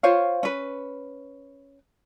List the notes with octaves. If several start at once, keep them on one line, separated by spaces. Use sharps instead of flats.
F4 C5 C#5 F5
C#4 B4